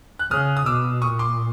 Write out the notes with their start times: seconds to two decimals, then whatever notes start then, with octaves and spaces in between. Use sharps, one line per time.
0.19 F#6
0.31 C#3 D#6 F6
0.57 D#6
0.66 B2 D6 E6
1.02 A#2 C#6 D#6
1.19 C6 D6